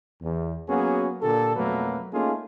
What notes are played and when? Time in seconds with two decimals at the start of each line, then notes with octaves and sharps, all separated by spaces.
0.22 E2
0.68 F#3 A#3 B3 C#4 F#4 G#4
1.22 A#2 D3 G4 A4
1.56 F2 B2 F#3 A3 A#3 B4
2.12 A3 A#3 C#4 D#4 F4 G#4